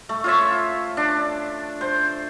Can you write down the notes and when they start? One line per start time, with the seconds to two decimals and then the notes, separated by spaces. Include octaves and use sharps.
0.09 A3
0.24 F4 C#5 E5
0.97 D4
1.81 C5